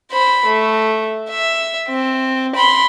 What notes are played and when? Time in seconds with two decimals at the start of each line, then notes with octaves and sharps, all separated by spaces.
0.12 C5 B5
0.46 A3
1.30 E5
1.88 C4
2.56 B5 C6